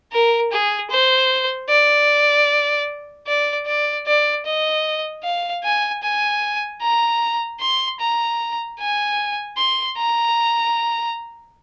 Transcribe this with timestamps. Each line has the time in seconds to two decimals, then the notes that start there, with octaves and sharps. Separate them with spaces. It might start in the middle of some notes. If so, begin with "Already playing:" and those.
0.12 A#4
0.52 G#4
0.91 C5
1.69 D5
3.27 D5
3.67 D5
4.07 D5
4.46 D#5
5.24 F5
5.64 G#5
6.03 G#5
6.82 A#5
7.61 C6
8.00 A#5
8.79 G#5
9.57 C6
9.97 A#5